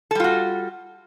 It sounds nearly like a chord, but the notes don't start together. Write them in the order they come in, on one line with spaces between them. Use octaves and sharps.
A4 G3 F4 F#4